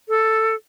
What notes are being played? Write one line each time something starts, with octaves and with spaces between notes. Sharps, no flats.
A4